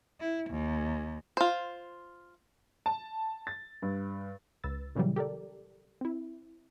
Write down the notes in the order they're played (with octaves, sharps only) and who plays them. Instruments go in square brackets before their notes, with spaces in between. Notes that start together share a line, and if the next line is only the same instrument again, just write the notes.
[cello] E4
D#2
[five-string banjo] F4 C5
[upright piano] A5
A6
G2
[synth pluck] C#2 B4 E6 A6
A#2 C#3 E3 F#3 G3
G4 A4 A#4 D5
C4 E4